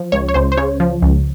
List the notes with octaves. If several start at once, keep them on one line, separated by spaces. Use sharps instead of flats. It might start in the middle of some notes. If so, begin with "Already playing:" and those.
Already playing: F3
C#2 C#5
C#5
C#2 C5
C5
C#3 C#5
F3
C#2